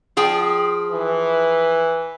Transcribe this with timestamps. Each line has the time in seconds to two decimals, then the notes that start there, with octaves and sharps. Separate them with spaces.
0.17 F3 G#4 G5
0.91 E3